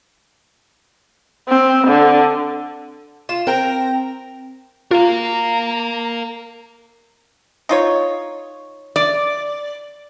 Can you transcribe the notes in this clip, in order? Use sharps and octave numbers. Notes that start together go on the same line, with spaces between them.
C4
D3
F4 E7
C4 A#4 G5 A#6
F4 A#4 F5 A#5
D#4 F4 C#5
D5